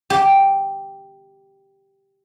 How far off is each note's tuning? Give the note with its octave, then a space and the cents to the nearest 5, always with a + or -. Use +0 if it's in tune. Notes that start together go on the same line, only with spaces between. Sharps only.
G4 +0